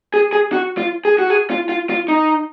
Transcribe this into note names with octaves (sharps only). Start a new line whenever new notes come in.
G#4
G#4
F#4
F4
G#4
F#4
G#4
F4
F4
F4
D#4